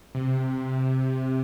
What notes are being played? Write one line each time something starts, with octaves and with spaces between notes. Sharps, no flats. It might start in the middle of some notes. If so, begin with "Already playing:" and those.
C3